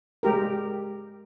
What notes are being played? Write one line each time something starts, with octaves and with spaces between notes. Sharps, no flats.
G#3 G4 A#4